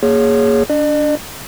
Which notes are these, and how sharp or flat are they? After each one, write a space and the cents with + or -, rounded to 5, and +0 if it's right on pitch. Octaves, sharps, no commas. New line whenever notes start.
A#3 +0 G#4 +0 C#5 +0
D4 -20 D5 +45